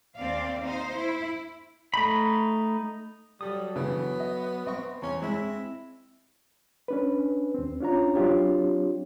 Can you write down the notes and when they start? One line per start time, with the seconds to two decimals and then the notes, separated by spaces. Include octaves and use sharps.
0.16 D#2 C4 D5 F5
0.64 D#4 C5
0.95 E4
1.94 A3 D#4 B5
3.41 F#3 G3 A4 D#6
3.76 C#3 E3 B3
4.20 D#5
4.67 C4 D#5 C#6
5.02 E2 C#4
5.22 G#3 E4
6.88 C#4 D4 B4
7.54 D#2 C4
7.81 C#4 D4 F4 C#5 A#5
8.15 F#3 C4 D4 F4 G4 C#5